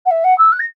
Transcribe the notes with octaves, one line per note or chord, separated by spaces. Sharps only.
F#5
E5
F#5
E6
F#6
A#6